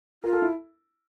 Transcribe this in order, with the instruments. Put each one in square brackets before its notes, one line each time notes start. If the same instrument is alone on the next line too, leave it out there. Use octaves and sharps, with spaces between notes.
[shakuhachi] F4 [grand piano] A#4
[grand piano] A4
E4